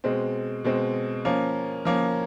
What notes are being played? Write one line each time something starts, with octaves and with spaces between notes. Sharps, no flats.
B2 G#3 C4
B2 G#3 C4
F3 A#3 C#4
F3 A#3 C#4